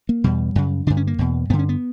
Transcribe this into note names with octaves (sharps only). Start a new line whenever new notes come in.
A#3
E2 B2 G3
F#2 C#3
G2 D3 D4
C#4
A#3
E2 B2
G2 D3 B3
C#4
B3